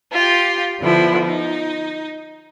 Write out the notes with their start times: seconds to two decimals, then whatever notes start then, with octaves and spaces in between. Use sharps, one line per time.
0.12 F4 G4
0.81 D3 F3 B3 E4
1.26 D#4